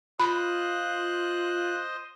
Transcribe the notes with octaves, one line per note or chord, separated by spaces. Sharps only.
F4 C5 D#5 B5 F#6